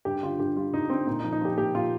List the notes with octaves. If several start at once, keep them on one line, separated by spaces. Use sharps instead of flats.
G2 G4
D3 F4
G2 G4
G3 F4
G2 D#4
D3 C4
A#2 D#4
D#4
F3
D#4
F3 G4
A#2 G4
A#2 F4